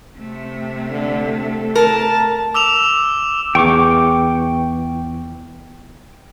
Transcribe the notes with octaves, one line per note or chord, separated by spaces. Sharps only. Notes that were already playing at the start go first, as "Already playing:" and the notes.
C3 A3
D3
A4
A#4 A5
D6 E6 E7 F7
E2 G5 C#6 D6